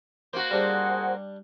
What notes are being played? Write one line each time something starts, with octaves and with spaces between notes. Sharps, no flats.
A#3 F#4 C5
G3 D4 G4 G#4 C5 F#5